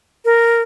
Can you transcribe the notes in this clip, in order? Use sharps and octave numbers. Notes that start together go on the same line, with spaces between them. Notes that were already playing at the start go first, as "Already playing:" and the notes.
A#4